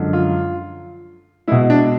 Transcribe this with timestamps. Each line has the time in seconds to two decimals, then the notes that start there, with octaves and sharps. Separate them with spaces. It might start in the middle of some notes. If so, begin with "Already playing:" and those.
Already playing: F#2 D3 F3 G#3
0.13 F4
1.48 B2 G#3 E4
1.70 D4